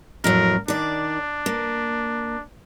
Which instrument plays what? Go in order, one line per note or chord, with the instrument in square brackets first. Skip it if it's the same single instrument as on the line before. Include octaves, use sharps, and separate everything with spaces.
[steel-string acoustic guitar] F2 A2 F#3 [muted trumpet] A#4
[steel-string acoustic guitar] D#3 D5 [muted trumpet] D4
[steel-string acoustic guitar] A#3